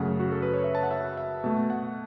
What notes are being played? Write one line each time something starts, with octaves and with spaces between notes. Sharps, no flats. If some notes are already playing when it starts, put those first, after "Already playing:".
Already playing: F#2 C#3 A3 F#5
F#4
A4
B4
C#5
E5
A5
F#5
E5
E5
B2 A3 A5
F#5